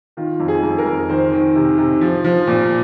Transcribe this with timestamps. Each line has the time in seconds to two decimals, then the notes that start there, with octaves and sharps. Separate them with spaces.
0.17 D#3 F4
0.40 F2
0.48 G#4
0.63 F2
0.78 A#4
0.86 F2
1.09 D#3 C5
1.33 D#3
1.55 C3
1.78 C3
2.01 F3
2.24 F3
2.47 A#2